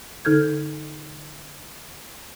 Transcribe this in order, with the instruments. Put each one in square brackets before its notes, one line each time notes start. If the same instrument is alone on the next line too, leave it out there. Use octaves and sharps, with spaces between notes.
[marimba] D3 D#4 A4 F6 G6 G#6